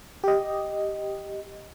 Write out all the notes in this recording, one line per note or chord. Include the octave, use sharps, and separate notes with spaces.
G4 D#5